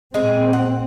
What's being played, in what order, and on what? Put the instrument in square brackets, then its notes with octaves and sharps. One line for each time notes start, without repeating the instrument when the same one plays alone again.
[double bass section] A#2 C4 [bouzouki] G#3 G#4
[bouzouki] F#5